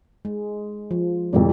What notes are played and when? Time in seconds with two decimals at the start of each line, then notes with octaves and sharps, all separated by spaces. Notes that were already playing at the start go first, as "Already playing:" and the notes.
0.25 G#3
0.91 F3
1.33 G#1 F2 C3 E3 G3